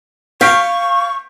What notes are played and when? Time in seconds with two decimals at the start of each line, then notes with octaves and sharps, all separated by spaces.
0.41 F5 C#6 G6 B6 D7